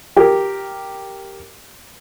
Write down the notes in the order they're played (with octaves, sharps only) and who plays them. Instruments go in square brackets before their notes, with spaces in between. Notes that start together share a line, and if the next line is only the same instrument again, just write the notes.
[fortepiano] G4 A#4